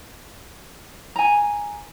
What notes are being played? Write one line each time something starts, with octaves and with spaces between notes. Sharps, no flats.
G#5 A#5